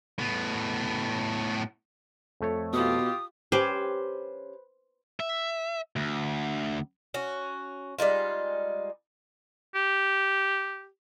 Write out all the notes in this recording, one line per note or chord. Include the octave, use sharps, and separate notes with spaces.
A2 B3
F2 A3 C#5
B2 F4 G4 D#6
C#4 G4 B4 C5
E5
D2
C#4 F#4
G3 G#3 D#4 F4
G4